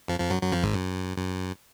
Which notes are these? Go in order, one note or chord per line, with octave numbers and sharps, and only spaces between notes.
F2 F3
F2 F3
F#2 F#3
F#2 F#3
F2 F3
G#1 G#2
F#2
F#2